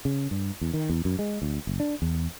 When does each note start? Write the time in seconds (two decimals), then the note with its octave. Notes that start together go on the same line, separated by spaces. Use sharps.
0.05 C#3
0.31 G2
0.61 E2
0.73 D#3
0.89 E2
1.05 F#2
1.19 G#3
1.42 D2
1.67 F#1
1.80 D4
2.02 E2